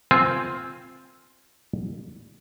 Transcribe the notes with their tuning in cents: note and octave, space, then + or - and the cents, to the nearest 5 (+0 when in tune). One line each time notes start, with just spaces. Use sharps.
C4 +0 F4 +0 G#5 +0